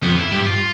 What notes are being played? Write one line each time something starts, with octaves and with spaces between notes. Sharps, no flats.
F2 B3
E4
G2 G4
F4